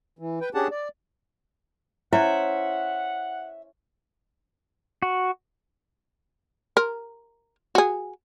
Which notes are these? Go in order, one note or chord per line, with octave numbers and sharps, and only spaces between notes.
E3
B4 G5
C#4 D4 G4 G#4 F#5 A5
D5
C#4 E4 C5 C#5 E5 F#5
F#4
A#4
F#4 G#4